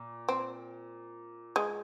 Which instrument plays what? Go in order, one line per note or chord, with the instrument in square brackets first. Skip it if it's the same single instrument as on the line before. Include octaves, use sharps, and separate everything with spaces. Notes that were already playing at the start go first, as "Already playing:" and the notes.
Already playing: [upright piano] A#2
[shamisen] C4
G#3